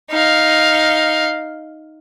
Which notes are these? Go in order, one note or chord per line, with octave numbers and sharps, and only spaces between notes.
D#4 F5